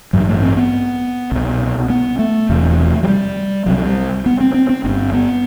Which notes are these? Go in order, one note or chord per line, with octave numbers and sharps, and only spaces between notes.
A1 G2 F#3
A3
C4
B3
C2 B2
B3
A3
E1 E2 C3
F#3
G3
C2 C3 F#3
G3
B3
C4
C4
C4
G1 G2 C4
B3